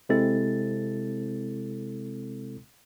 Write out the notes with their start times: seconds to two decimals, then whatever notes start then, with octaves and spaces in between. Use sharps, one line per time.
0.09 C3 G#3 C4 E4 A4 A6